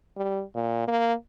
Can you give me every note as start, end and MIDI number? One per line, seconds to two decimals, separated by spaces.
0.17 0.42 55
0.55 0.84 46
0.87 1.13 58